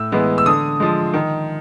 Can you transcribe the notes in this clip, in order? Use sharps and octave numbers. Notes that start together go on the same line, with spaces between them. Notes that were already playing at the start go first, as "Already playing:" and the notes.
Already playing: A2 E6
E3 G#3 B3
E6
D3 D#6
F3 G#3
D#3